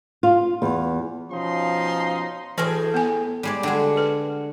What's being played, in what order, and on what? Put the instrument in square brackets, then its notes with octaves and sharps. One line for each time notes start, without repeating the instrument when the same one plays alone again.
[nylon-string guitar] F4
E2
[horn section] B2 F3 C#4 D#4 C6
[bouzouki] A2 G#4 G5 [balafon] E3 F#4 B4
[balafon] B3 G#5
[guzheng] G3 G#3 D5
[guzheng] D3 G#3 [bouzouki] F#4 [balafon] F#5 G5
[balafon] A4 B4